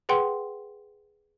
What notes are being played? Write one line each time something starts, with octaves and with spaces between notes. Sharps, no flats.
G#4 B4 F#5 G5 C6